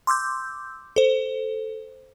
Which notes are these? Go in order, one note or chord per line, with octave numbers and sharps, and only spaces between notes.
C6 D6 E6 G6
A4 C5